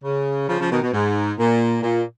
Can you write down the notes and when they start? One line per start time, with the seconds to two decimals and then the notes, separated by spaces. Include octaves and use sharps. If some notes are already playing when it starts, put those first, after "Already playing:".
0.04 C#3
0.48 C#3 F3
0.60 C#3 F3
0.71 B2 D#3
0.82 B2
0.93 G#2
1.39 A#2
1.82 A#2